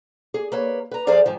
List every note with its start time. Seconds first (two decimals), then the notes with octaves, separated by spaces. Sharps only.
0.34 G#4
0.52 A#3 B4 C#5
0.91 B4 A#5
1.07 F#2 F3 G#4 C5 D5 F5
1.26 G#2 D#3 F3